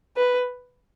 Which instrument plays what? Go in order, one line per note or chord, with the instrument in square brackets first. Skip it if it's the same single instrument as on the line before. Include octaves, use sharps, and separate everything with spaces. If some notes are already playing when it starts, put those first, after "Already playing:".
[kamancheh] B4